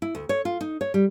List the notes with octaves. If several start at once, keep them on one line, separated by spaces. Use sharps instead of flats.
E4
D2
C#5
F4
D#4
C#5
G3